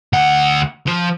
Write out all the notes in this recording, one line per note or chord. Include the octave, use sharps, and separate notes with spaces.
D2 F#5
F3